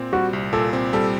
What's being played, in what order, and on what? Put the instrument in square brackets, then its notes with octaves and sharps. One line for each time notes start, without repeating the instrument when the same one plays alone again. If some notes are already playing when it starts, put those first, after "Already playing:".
Already playing: [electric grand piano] A#2 C4
[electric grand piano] G3 [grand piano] F#4
[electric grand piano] C2
[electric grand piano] A#2 [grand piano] A4
[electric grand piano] C4
[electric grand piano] G3 [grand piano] A4